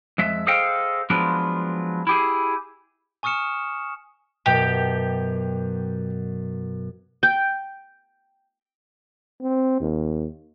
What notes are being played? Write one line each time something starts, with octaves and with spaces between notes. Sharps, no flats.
F2 G#3 E5
G#4 A4 C5 D#5 F5 G5
F3 F#3 G#3 B3 D4 F4
E4 G4 G#4
G#5 C#6 D#6 F6 C#7 E7
F#2 B2 G4
G5
C4
D#2